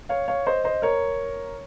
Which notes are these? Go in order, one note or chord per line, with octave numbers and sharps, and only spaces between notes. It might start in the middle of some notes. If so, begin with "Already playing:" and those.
C#5 F5
C#5 F5
C5 D#5
C5 D#5
A#4 C#5